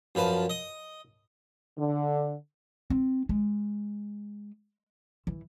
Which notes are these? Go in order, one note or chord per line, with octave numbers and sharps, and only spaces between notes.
F#2 F3 B4 A5
D#5
D3
C4
G#3
E3